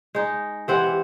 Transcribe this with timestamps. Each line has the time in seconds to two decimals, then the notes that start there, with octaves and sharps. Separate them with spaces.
0.15 G#3 D#4
0.68 E3 C4 G4 F#5